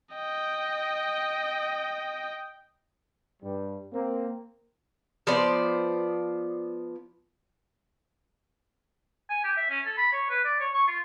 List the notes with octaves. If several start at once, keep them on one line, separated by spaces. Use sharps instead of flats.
D#5 G5
G2 G3
A#3 C4
F3 B3 C5 D5
G#5
G4
E5
C#4
A4
B5
C#5
B4
D5
C#5
C#6
F4